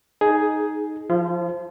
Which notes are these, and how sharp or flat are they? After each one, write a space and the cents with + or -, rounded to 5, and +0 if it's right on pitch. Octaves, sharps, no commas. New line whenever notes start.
D#4 +0 G#4 +5
F3 +0 F4 -35